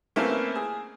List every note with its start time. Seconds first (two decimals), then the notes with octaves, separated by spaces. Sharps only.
0.16 A3 A#3 C4 C#4 E4 B4
0.55 G#4